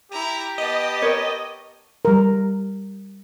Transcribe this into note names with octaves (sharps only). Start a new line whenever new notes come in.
E4 G4 A#5
B3 D#5 A5
A#4 C#5
G3 A#4